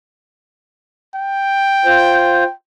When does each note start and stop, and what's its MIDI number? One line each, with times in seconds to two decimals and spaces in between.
1.15 2.52 79
1.85 2.44 65
1.85 2.44 72